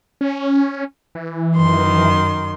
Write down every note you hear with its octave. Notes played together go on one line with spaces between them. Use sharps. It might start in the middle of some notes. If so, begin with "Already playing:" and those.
C#4
E3
F#2 D#3 C6